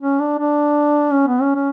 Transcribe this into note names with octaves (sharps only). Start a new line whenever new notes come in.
C#4
D4
D4
C#4
B3
C#4
C#4